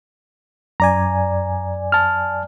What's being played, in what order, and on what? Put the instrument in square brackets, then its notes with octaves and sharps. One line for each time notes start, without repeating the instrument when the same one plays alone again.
[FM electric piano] F#2 D5 G#5 [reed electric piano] A#5
[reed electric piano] A5 F6